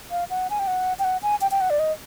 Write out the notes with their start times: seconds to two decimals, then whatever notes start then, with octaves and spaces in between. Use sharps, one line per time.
0.11 F5
0.30 F#5
0.50 G#5
0.59 G5
0.67 F#5
0.99 G5
1.04 F#5
1.23 G#5
1.41 G5
1.51 G5
1.61 F#5
1.70 D5
1.79 D#5